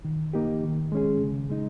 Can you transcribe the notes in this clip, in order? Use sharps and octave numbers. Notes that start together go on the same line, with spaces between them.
D#3
A#3 D#4 G4
D#3
G#3 C#4 G#4
C#3
G#3 D#4